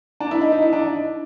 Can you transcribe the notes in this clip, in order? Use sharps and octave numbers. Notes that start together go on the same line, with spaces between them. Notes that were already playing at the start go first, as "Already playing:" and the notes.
D4
E4
D#4
D#4
E4
D4